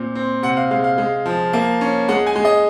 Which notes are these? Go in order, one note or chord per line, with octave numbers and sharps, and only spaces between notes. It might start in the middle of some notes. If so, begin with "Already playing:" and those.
Already playing: A#2 C4
C4
C3 F#5
F5
G#3 F5
F5
G#3
F3
A#3
C#4
G#3 F#5
G#5
G#3
D#5